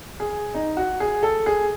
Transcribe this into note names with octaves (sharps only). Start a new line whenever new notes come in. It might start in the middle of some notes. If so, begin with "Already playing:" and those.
G#4
D#4
F#4
G#4
A4
G#4